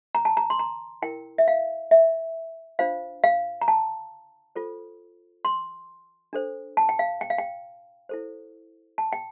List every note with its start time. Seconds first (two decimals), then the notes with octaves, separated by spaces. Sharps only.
0.15 A#5
0.25 A5
0.37 A#5
0.50 C6
0.59 A#5
1.02 E4 A#4 G5
1.38 E5
1.48 F5
1.91 E5
2.79 D4 F4 C5 F5
3.24 F5
3.61 A#5
3.68 A5
4.55 F4 A4 C5
5.45 C6
6.33 D4 A4 C5
6.77 A5
6.89 G5
6.99 F5
7.21 G5
7.30 F5
7.38 G5
8.09 E4 A4 C5
8.98 A5
9.13 G5